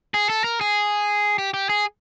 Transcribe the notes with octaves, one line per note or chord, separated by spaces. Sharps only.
G#4
A4
A#4
G#4
G4
G4
G#4